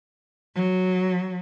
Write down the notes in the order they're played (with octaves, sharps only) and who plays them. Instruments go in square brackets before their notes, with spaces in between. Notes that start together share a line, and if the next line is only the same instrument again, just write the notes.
[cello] F#3